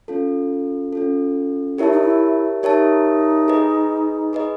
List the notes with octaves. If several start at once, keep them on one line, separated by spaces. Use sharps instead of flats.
C#4 F4 A4
C#4 F4 A4
E4 G4 A#4 C#5 E5 A5
D#4
E4
D#4 G4 A#4 C#5 E5 A5
G#4 B4 D#5
G#4 B4 D#5